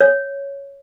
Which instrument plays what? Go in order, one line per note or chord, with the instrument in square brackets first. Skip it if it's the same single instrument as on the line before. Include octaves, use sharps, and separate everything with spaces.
[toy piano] C#5